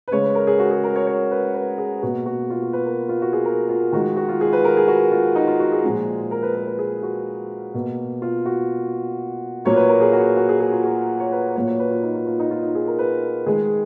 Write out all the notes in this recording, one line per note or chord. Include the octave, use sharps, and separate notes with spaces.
B4
C#3 G#3 C#5
B4
A#4
G#4
F#4
G#4
A#4
C#5
C#5
B4
B4
G#4
B2 A#3 F#4
F#4
F4
F#4
B4
A#4
F4
F#4
G#4
A#4
F4
D#3 G#3 F#4
F#4
F4
G#4
B4
A#4
G#4
F#4
F4
D#4
F4
F#4
G#4
A#2 F3 G#3
A#4
B4
A#4
B4
G#4
F#4
B2 A#3
F4
F#4
A#2 F#3 A#3 C#5
B4
A#4
G#4
F#4
F#4
G#4
G#4
F4
F#4
C#5
B4
A#2 F#3 A#3 C#5
C#5
B4
F4
D#4
F4
F4
D#4
F4
D#4
G#4
A#4
B4
D#3 G#3 G#4